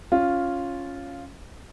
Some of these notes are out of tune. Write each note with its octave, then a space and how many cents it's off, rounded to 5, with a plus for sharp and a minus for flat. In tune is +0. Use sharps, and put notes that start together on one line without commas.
C#4 +0 F4 +0